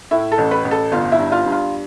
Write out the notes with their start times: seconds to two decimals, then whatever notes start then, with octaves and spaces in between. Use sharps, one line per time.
0.11 A2 E4 E5
0.32 A4 A5
0.38 A1
0.51 B4 B5
0.65 A1
0.71 A4 A5
0.92 G1 F4 F5
1.12 E4 E5
1.18 G2
1.32 F4 F5
1.45 G2
1.52 F4 F5